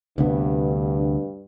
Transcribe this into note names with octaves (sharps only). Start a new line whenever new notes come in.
D2 G2 C3 B3